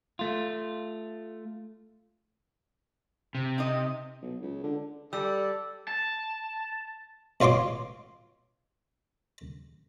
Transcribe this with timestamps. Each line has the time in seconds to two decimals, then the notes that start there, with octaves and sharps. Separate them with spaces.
0.19 A3 F4
3.35 C3
3.58 C4 D#4 D#5
4.22 B1
4.41 C#2
4.64 D3
5.13 G3 A4 D5 E6
5.88 A5
7.41 B2 F4 C#5 C6 D6